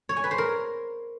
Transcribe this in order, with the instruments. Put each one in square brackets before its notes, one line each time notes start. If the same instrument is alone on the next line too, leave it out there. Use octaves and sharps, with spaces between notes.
[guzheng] C#5
G#5
B4
C5
A#4